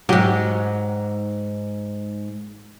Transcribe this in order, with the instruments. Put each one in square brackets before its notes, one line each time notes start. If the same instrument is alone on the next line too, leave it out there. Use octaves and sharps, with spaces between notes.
[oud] G#2 G4 [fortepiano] F#3